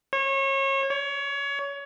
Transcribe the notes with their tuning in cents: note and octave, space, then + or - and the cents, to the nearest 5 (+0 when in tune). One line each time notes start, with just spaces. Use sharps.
C#5 -30
C#5 +25